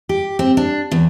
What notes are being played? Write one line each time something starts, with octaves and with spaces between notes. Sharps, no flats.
G4
C4
D4
E2